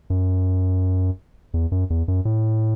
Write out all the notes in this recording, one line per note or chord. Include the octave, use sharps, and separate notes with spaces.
F#2
E2
F#2
E2
F#2
A2